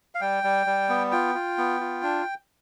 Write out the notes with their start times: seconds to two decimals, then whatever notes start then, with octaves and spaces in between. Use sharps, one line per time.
0.15 F5
0.21 G3 G5
0.44 G3
0.67 G3
0.89 B3
1.12 F4 G5
1.35 F4
1.58 B3
1.80 F4
2.03 D4